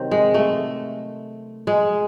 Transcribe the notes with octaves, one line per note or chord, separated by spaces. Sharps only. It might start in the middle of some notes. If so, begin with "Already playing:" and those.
Already playing: C3 D#3 F#3 C4
G#3
A3
G#3